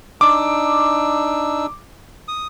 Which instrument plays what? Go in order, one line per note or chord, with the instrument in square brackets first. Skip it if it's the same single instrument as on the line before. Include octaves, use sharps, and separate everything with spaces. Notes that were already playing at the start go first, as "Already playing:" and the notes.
[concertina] D4 D#4 E6 [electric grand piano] D6
[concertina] D#6